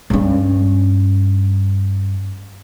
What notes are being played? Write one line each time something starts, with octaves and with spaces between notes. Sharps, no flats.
G2 C#4